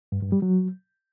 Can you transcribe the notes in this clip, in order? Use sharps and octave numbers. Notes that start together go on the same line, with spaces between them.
G2
G2
G3
F#3